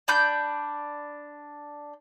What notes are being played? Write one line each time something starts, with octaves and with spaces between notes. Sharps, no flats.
D4 B5 G6